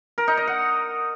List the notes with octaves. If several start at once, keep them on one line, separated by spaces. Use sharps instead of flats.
A#4
D#4
D#5
F#5